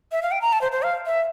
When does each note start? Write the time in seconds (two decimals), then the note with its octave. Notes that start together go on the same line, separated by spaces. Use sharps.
0.12 E5
0.22 F5
0.31 G5
0.41 A#5
0.52 A5
0.61 C5
0.72 C5
0.83 F5
1.06 E5